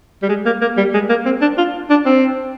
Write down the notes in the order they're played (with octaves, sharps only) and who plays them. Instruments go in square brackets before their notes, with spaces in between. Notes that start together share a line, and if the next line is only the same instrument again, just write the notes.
[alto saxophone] G3
G#3
A#3
A#3
G3
G#3
A#3
C4
D4
F4
D4
C4